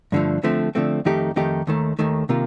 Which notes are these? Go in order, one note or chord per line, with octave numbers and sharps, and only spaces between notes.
G2 D3 F3 A3
D3 F3 A3 C4
D3 F3 A3 C4
F2 D#3 A3 D#4 G4
F2 D#3 A3 D#4 G4
D#2 D#3 A3
D#2 D#3 A3
C3 D#3 A#3 F4